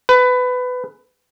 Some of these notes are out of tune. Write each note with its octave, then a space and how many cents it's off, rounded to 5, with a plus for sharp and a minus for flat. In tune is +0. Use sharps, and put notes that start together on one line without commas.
B4 +20